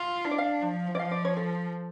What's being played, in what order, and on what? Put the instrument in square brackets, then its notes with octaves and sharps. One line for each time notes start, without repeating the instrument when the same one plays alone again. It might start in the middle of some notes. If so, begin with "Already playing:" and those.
Already playing: [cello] F4
[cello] D4 [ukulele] F5
[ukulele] D5
F5
[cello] F3
[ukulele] D5
[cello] F3 [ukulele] F5
[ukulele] D5
C#5
A4